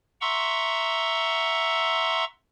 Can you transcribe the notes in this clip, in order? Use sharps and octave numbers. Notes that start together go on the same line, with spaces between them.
E5 F#5 A#5 C6 C#6 E6